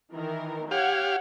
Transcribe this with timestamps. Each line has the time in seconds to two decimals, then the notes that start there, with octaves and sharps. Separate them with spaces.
0.14 D#3 E3 A#4
0.71 G4 C#5 F5 F#5 G#6